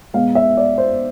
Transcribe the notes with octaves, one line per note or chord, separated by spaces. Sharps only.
B2 G#3 B3 F5
E5
D5
C5